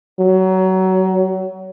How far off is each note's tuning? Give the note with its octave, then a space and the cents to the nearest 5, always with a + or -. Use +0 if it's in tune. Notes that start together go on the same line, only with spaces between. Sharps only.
F#3 +25